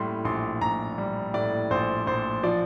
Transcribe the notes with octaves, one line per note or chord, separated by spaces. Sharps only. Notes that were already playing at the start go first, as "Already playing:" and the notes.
Already playing: A2 G3 C6
A#1 C6
A#1 A#5
G3
A2 D5
A#1 C5
A#1 C5
F3 D5